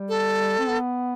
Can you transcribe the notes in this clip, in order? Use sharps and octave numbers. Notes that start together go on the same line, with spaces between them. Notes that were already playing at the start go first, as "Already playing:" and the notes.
Already playing: G3
A4
C4
B3